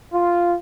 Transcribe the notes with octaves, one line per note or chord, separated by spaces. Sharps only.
F4